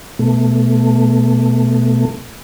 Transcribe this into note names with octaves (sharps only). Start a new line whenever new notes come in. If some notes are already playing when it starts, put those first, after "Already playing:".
B2 A3